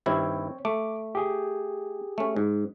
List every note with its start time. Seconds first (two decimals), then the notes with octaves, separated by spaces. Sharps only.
0.06 G2 D#3 C4 E4 C#5
0.65 A3 D6
1.15 G4 G#4
2.18 A3 C#4
2.36 G#2